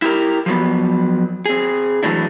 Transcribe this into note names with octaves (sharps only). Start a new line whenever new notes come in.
E4 G4 A#4
F3 F#3 B3
C4 G#4
E3 F#3 A3 D4 E4